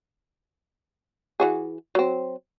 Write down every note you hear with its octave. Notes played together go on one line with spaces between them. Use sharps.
E3 F#4 G#4
F#3 C4